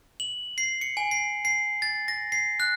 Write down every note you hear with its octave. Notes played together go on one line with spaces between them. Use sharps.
F#7
C7
C#7
G#5
C7
C7
A6
A#6
C7
F#6